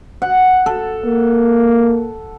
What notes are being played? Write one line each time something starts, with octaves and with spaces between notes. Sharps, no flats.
F#5
A4
A#3